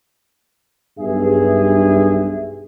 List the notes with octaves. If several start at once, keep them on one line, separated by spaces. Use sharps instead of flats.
B1 G2 G#4 E5